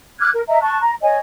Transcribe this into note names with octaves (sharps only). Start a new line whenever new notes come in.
D6 F6 F#6 G#6
A#4
D#5 E5 A#5
A5 C#6 F#6
A#5
C#5 D#5 G#5